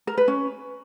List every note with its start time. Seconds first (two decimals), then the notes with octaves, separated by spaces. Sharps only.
0.07 A#4
0.18 B4
0.28 C#4